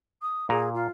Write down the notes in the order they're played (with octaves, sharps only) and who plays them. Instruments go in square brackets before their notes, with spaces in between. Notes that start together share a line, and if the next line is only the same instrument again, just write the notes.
[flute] D#6
[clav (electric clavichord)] A#2 A#5 [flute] G#4
[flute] F4